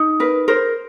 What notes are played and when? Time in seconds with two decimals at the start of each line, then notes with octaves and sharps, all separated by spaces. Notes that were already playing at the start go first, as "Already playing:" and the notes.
Already playing: D#4
0.20 A#4 B4
0.48 A#4 C5